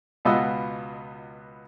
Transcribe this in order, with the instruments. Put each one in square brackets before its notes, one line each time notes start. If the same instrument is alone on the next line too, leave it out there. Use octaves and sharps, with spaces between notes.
[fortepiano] C#2 B2 B3 F4 D#5 E6